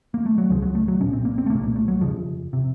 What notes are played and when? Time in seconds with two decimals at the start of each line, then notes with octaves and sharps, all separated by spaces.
0.14 A#3
0.26 A3
0.38 F#3
0.49 C#2 C#3 F3
0.62 F#3
0.75 A3
0.88 F#3
1.00 C2 A#2 C#4
1.13 C4
1.25 A#3
1.38 C4
1.46 A3
1.50 C2 A#2 A#3
1.63 A#3
1.76 A3
1.88 F#3
2.00 F2 C#3 F3
2.53 C3